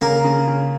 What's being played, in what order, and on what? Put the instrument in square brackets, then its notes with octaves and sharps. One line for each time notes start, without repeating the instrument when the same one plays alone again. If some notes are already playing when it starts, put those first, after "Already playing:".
[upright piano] C#3 [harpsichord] A#3 A#4
[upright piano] C#3
C#3